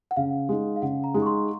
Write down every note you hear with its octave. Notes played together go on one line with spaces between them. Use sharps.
F#5
C#3 F5
G#3 D#4
F5
C#3 F#5
A#5
G#3 D#4
C#6
C6